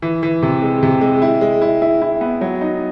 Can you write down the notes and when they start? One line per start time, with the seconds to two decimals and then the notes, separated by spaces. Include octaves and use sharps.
0.02 E3
0.23 E3
0.43 C3
0.62 G#3
0.83 C3
1.01 G#3
1.22 E4
1.41 G#3
1.62 E4
1.82 E4
2.02 E4
2.21 B3
2.41 F#3
2.61 D#4